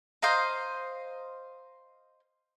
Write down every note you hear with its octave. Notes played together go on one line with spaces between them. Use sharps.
C5 D#5 F5 A#5